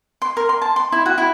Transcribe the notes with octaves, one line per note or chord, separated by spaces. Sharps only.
C6
A#4
C6
A5
C6
E4
F#4
E4